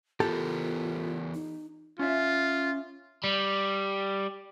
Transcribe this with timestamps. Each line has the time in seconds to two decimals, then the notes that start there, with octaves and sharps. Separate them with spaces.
0.20 E3 B3 F4 G4 A4 A#4 A5
1.34 D#4
1.99 C#4 F4 E5
3.24 G3